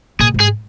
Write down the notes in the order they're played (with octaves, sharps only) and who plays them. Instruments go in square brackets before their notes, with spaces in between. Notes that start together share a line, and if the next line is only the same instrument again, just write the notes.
[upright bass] A#2 [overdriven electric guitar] G#4
[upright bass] G#2
[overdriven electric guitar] G#4